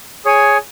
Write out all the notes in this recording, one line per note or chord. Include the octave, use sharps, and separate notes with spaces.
G#4 C#5 G#5